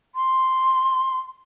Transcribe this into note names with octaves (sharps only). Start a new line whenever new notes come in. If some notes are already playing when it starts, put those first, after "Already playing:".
C6